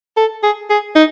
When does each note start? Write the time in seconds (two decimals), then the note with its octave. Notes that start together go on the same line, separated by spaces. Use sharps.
0.17 A4
0.43 G#4
0.70 G#4
0.96 D#4